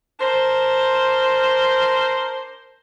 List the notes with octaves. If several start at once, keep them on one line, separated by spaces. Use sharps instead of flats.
D4 A#4 C5